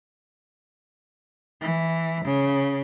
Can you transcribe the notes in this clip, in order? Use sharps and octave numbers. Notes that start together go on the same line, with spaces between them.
E3
C#3